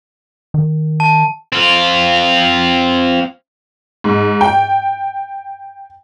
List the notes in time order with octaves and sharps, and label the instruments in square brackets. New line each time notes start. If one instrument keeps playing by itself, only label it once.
[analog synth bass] D#3
[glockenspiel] A5
[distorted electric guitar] C4 F4
[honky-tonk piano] G#2
G5